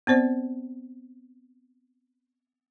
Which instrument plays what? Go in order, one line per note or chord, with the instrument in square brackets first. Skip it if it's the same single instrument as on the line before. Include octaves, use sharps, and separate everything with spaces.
[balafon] B3 C4 C5 D5